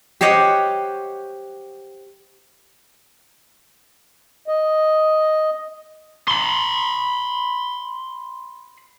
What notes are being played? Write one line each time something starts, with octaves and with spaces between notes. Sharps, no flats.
G4 C5 C#5 D#5 F#5
D#5
B5 C6